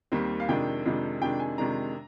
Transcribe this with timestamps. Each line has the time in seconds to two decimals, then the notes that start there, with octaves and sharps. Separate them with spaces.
0.12 D#2 D#3 G3 C4
0.40 F5
0.49 F2 C3 D#3 G#3 D4 G5
0.86 F2 C3 D#3 G#3 D4
1.21 F2 C3 D#3 G#3 D4 G5
1.40 G#5
1.58 F2 C3 D#3 G#3 D4 A#5